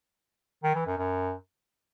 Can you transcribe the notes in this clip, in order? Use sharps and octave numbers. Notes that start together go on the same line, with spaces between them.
D#3
E3
F#2
F#2